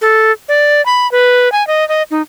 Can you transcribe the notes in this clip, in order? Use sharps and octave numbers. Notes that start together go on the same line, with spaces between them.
A4
D5
B5
B4
G#5
D#5
D#5
D#4